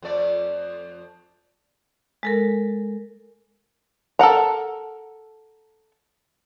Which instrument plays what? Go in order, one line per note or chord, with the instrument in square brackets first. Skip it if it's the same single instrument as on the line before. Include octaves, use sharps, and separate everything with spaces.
[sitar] F2 A3 D5
[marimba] G#3 A4 A#4
[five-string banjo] A4 A#4 F#5 A#5